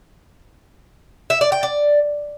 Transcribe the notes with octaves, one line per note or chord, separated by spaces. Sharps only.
E5
D5
G5
D5